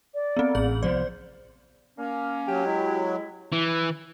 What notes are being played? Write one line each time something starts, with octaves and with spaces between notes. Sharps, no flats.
D5
B3 C4
A1 G#4 F#7
C2 F3 B3 C5 D5
A#3 C#4
F#3 G4
G#3 E4
E3